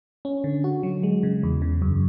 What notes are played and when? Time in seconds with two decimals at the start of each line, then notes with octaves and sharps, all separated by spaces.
0.25 C#4
0.44 D3
0.64 F#4
0.83 F#3
1.03 G#3
1.23 C#3
1.43 E2
1.62 C#3
1.82 F#2